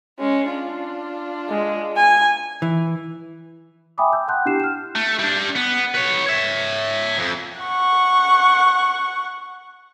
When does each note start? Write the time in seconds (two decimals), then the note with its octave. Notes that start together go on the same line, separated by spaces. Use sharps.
0.19 G#3 C#4
0.50 D4 F4
1.50 G#3
1.96 G#5
2.62 E3
3.98 E5 G5 G#5 B5 D6 D#6
4.12 A5 E6 G6
4.28 F#5 G5 A5 C6 F#6 G6
4.46 D4 E4 G4 C7 E7
4.60 F6 E7
4.95 A3
5.19 G3 D4
5.55 B3
5.94 B4 C#5
6.26 C#5 E5
7.19 F2
7.61 F#5 C#6